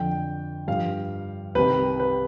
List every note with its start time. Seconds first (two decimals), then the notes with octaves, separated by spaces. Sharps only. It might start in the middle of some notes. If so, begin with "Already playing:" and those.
Already playing: F2 D3 F3 G5
0.68 G2 F3 F5
1.55 C2 C3 D#3 B4
2.00 B4